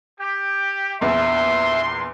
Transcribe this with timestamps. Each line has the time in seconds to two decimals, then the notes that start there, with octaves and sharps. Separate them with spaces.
0.19 G4
1.01 A#1 E2 E5 C6